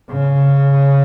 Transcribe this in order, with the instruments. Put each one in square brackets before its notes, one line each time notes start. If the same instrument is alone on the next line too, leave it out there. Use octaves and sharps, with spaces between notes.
[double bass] C#3